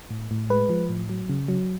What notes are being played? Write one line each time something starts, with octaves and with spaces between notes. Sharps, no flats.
A2
A2
G#3 B4
F3
A2
F#3
C#3
F#3